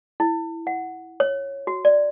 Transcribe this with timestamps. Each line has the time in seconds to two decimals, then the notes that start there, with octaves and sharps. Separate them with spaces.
0.20 E4
0.67 F#5
1.20 C#5
1.67 F#4
1.85 D5